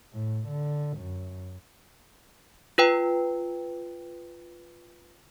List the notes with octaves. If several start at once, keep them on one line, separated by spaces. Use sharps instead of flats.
A2
D3
F#2
F4 B4 G5